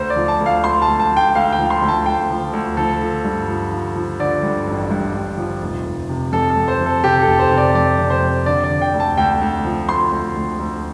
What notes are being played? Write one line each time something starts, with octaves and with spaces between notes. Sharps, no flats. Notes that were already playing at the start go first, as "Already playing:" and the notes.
Already playing: D2 C5
D5
F3
A5
D2
F5
D2 C6
A5
D2
A5
D2
G5
D2 F5
G5
F3
C6
D2
A5
D2 G5
F3
D2
F3 A4
F3
G2
F3
F3
F3
D3 D5
G2
A1
G2
G2
F3
F1
F1
C3
F2 A4
A4
F2
C5
C3
A4
C3 G4
A4
F1
C5
C3
D5
F2 D5
C3
C5
F2
D3 D5
D5
D3
G5
D2
A5
D2 G5
D2
F3
D2 C6
D2
D2
D2